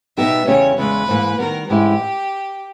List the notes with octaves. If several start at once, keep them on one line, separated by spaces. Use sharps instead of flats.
B2 G3 B3 D#4 G4 E5
E2 C#3 G3 C#4 G4 C#5
E2 C#3 G#3 B4
G#2 E3 A#3
D#3 G3 B3 A#4
G#2 E3 G#3 C#4 E4 G4